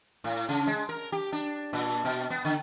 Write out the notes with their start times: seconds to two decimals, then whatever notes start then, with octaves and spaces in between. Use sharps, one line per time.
0.24 A2
0.49 C#3
0.67 G#3
0.89 A#4
1.12 G4
1.32 D4
1.73 A#2
2.05 B2
2.30 B3
2.45 D3